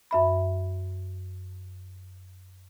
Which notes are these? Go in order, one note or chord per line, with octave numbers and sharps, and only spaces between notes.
F#2 E5 B5